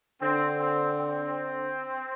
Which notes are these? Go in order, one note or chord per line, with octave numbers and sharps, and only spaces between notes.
D3 C4
C4
C4